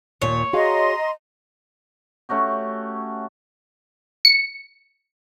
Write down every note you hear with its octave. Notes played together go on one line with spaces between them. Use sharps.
D#2 A#2 C#5
F#4 G#4 D#5 F5 A#5 C6
A3 C#4 F#4 G4
C#7